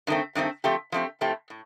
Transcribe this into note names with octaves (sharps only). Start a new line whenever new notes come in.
G2 D#3 A3 C4
G2 D#3 A3 C4
F3 A3 C4 G4
F3 A3 C4 G4
A2 F3 A3 C4 G4
A2